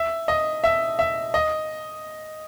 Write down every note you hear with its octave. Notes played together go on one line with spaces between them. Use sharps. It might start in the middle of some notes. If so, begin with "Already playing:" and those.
Already playing: E5
D#5
E5
E5
D#5